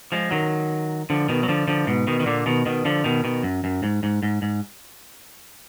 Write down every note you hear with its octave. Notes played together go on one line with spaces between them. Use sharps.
F3 G#3
D#3 F#3
D3 F3
B2 D#3
F#3
D3 F3
D3 F3
G#2 B2
B2 D#3
D#3
A#2 D3
B2 D#3
B2 D#3
D3 F3
B2 D#3
B2 D#3
F#2
F#2
G#2
G#2
G#2
G#2